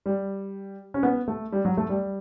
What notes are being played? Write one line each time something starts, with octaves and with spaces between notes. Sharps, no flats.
G3
C#4
B3
A3
G3
F#3
A3
G3